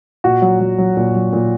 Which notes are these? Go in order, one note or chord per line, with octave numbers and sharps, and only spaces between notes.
A#2 F#4
F#3
F#3
F#3
A#2
F#3
A#2